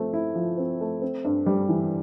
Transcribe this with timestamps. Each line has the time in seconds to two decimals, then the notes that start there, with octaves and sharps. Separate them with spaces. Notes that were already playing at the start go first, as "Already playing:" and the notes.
Already playing: F3 A3 C4
0.13 E4
0.35 F3
0.58 C4
0.80 A3
1.02 C4
1.25 G2
1.46 G3
1.69 E3